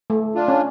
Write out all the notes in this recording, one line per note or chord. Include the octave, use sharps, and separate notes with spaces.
A3
D4 F4
C#4